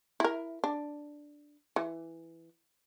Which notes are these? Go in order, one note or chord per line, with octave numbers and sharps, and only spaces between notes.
E4 A#4
D4
E3